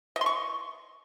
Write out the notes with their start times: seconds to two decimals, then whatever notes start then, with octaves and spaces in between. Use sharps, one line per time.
0.16 D#5
0.21 C6
0.26 C#6